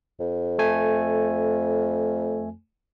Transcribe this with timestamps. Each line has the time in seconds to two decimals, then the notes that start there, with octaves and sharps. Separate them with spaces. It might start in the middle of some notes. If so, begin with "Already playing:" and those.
0.20 F2
0.59 A3 G#5